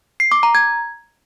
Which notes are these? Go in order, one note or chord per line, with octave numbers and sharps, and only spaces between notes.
C7
D6
A#5
G#6